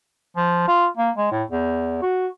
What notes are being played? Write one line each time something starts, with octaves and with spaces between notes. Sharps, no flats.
F3
F4
A#3
G#3
A2
E2
F#4